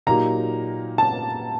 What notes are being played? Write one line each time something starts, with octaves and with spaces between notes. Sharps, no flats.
A#2 F#3 A#3 D#4 G4 A#5
A5